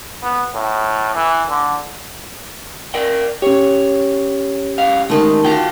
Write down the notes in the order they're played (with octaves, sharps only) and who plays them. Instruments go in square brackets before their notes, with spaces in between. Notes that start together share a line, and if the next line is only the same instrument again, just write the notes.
[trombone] B3
A2
E3
D3
[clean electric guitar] A#4 D5 G5
[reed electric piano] C#4 G4 [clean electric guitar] C#5
[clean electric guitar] C#2 F#2 F5
[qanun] D#3 A3 [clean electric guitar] G#3
[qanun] F4 A#5 C6 [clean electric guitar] F#4 G5